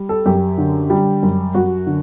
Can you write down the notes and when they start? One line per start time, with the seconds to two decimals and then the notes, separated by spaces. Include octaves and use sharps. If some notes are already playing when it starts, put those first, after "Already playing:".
Already playing: G3
0.09 A4
0.26 F#2 G4
0.58 D3
0.90 G3
1.23 F#2
1.55 F#2 F#4
1.87 D3